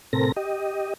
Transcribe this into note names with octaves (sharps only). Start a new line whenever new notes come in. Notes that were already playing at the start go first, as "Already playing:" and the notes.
A2 C3 C4 A4 A#4 A#6
G4 D#5